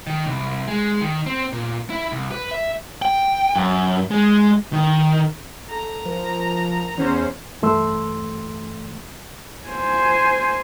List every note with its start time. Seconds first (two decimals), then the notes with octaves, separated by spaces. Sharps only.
0.07 D#3
0.26 C2
0.67 G#3
1.02 D#3
1.26 C4
1.52 A#2
1.90 E4
2.12 C2
2.31 B4
2.51 E5
3.02 G5
3.56 F#2
4.11 G#3
4.73 D#3
5.71 A4 A#5
6.05 F3 A#4
6.97 E2 C#4 C5
7.62 G2 E3 A3 C6 E6
9.67 C5 G#5